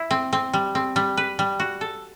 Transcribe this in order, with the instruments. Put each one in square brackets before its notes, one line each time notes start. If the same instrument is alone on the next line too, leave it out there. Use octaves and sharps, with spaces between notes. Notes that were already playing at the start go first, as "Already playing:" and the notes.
Already playing: [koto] E4
C4
C4
G3
C4
G3
B4
G3
F#4
A4